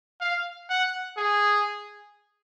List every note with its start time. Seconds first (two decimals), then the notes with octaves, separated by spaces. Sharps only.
0.21 F5
0.70 F#5
1.17 G#4